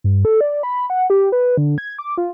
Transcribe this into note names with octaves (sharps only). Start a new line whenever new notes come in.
G2
A4
D5
B5
F#5
G4
B4
D3
G#6
D6
F4